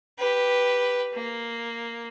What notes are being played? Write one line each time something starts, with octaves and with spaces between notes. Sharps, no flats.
G4 B4
A#3